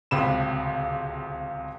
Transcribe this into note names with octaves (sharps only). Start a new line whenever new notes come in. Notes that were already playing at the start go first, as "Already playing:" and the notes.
D1 C#2 C3 B5 E7